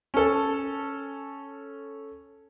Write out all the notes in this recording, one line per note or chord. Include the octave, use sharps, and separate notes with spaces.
C#4 A4